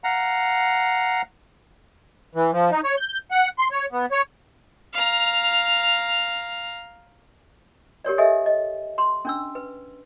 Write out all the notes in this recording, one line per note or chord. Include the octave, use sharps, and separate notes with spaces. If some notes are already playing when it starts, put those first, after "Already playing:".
F5 F#5 A#5
E3
F3
D#4
C#5
G6
F#5
C6
C#5
B3
C#5
F5 A#5
G4 A#4 C#5 D5
G4 A4 D#5 E5 G#5
D#5
C6
C#4 D4 E6
B4